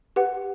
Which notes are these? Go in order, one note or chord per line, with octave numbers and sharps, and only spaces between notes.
G4 B4 F#5